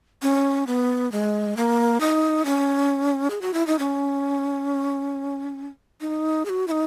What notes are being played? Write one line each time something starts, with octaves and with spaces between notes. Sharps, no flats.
C#4
B3
G#3
A#3
D#4
C#4
G#4
F#4
E4
D#4
C#4
D#4
G#4
F#4
E4
D#4